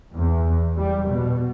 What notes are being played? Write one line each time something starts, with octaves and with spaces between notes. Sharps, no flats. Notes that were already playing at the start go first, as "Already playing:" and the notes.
E2
G3
B2